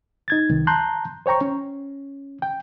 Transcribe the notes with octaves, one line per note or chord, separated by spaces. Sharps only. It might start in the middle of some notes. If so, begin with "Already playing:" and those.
D#4 G#6 A6
C2 D#3
A5 A#5 C6 F#6 G6
C5 C#5 G5 A#5 C#6
C#4
G5